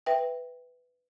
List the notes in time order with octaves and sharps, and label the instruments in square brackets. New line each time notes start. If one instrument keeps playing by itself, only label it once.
[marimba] B4 E5 G5